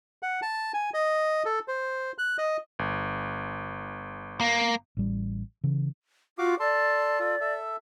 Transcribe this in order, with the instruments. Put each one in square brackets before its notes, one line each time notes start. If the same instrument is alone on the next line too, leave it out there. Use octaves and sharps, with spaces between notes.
[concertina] F#5
A5
G#5
D#5
A4
C5
F#6
D#5
[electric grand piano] G1
[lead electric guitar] A#3
[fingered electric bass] A1 G3
C#3 E3
[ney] F4 [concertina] F#4 F5 D6
[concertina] A4 A5 C6 [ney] D5
[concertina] F4 A4
A4 E5